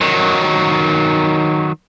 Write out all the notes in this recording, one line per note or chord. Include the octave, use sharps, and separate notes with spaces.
D#3 F#3